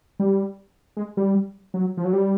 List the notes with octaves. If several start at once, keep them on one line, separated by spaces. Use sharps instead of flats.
G3
G#3
G3
F#3
F3
F#3
G3